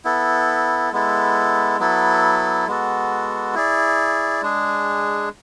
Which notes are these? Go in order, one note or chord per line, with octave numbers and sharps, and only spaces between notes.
B3 E4 A4
G#3 B3 E4 A4
F#3 B3 E4 A4
G#3 B3 F#4 A4
E4 G#4 D5
G#3 D4 G#4